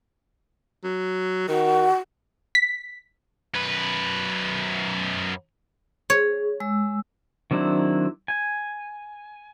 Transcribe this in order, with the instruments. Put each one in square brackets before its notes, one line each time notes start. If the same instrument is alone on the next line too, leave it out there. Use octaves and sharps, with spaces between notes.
[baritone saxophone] F#3
[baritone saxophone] D#3 [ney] F#4
[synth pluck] B6
[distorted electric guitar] F#2 B4
[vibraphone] G#4 [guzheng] C#5
[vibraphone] G#3 E6
[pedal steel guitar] D#3 F#3 C4 D4 E4
G#5